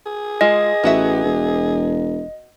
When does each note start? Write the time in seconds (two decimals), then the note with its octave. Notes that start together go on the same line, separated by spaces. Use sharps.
0.06 G#4
0.41 G#3 F4 D#5
0.84 A1 B3 F#4 E5
1.24 E1